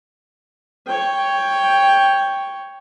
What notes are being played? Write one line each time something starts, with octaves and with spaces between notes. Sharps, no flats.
C#5 G5